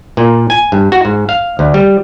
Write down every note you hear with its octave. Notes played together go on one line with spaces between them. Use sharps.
A#2
G#5
G2
F#4
G#2
F5
D2
G3